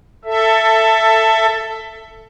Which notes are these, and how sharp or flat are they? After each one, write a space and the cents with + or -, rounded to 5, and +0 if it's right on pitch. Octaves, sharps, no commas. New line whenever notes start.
A4 +10 E5 +10